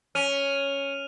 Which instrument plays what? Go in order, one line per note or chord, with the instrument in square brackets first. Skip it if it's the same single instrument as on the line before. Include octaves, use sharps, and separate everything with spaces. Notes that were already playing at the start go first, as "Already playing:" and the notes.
[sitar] C#4 [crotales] F6 D#7 F7